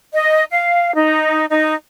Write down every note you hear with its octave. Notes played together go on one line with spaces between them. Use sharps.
D#5
F5
D#4
D#4